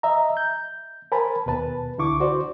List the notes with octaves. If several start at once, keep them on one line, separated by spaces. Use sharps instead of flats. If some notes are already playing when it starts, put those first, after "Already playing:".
D#5 E5 A#5
G6
A#4 C5 G#5 A5 B5
D#2 B2 B4 A5
C#2 D3 E4 C#6 D6
F#4 C5 D5